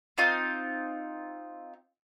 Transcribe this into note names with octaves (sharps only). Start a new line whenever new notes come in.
C4 D#4 F4 D#6